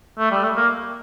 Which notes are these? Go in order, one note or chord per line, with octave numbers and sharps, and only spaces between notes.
A3
G3
A3
A#3